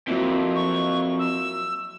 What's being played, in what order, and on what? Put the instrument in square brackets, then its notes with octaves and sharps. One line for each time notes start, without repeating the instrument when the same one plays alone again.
[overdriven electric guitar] F2 [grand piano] F#3 A#3 E4
[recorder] C#6
E6